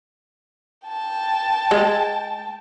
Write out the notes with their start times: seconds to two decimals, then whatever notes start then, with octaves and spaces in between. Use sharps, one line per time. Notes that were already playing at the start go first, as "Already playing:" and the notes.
0.87 G5 A5
1.71 G#3